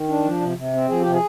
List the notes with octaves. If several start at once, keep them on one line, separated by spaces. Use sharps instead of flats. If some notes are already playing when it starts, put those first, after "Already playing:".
Already playing: D#3
D4
F3
C3
C3
C4
F3 G#4
G4
C3
G#4